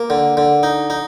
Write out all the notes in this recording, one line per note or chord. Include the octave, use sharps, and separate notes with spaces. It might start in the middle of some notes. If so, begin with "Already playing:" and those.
Already playing: A#3
D3
D3
D#4
D#4